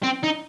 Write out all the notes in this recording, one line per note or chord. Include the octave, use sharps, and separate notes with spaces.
C4
D#4